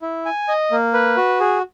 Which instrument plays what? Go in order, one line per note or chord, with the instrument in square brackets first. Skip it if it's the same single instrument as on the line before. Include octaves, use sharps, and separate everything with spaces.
[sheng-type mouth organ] E4
G#5
D#5
A#3
B4
F#4
G#4